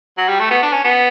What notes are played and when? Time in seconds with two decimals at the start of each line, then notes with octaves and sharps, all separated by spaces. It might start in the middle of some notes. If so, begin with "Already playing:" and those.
0.18 F#3
0.28 G3
0.39 A3
0.51 B3
0.63 D4
0.73 C#4
0.84 B3